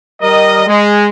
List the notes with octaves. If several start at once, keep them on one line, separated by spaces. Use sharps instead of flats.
G3 A#4 D#5
G#3